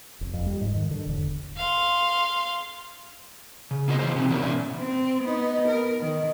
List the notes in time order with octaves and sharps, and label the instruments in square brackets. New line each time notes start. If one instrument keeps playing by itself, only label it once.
[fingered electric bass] F1
F2
G3
G#2
D#3
D3
E1
[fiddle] F5 C6
[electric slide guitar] C#3
A#3 B3 F4 F#4 C5 D#5
E3 F#3 F4 A#4 C5
C3 C4 C#4 D#4
E3 F#3 B3 D4 D#4 A#4
A#2 C#4 D4 E5
[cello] C4
B3 D#4
A#4
D#3